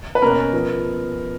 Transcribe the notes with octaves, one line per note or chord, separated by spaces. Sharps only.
B4
B2 A#3 C#4 A#4
F3 B3